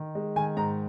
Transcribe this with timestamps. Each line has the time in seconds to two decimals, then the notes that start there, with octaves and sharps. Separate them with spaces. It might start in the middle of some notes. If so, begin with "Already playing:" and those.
Already playing: D#3
0.15 G#3
0.36 D#3 G#5
0.57 G#2 A#5